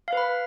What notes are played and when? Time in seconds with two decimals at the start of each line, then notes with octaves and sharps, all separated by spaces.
0.08 F5
0.13 B4
0.17 B5